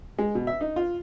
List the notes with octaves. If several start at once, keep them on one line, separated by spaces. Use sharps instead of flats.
G#3
B2
E5
D#4
F4